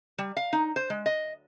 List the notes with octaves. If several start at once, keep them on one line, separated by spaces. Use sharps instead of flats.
G3
F5
D#4
C5
G#3
D#5